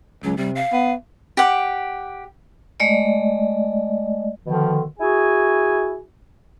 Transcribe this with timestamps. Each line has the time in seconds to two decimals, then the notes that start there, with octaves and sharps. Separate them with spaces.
0.24 C#2 F#3
0.37 C3 G3
0.55 F5
0.73 B3
1.37 G4 F#5
2.80 G#3 A3 D5 D#5
4.45 B2 D3 D#3 F3
5.00 E4 F#4 G#4 G#5